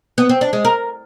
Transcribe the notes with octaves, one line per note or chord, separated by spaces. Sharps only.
B3
C4
D4
G#3
A#4